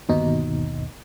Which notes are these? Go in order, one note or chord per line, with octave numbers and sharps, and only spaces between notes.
G1 D#2 B2 D#4